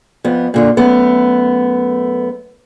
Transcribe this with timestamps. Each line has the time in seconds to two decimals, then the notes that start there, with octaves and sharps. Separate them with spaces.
0.24 F2 B3
0.54 A#2 D3 F4
0.77 F#2 A3 B3